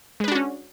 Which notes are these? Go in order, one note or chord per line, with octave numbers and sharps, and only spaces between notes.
G#3 C#4 D4 F#4 B4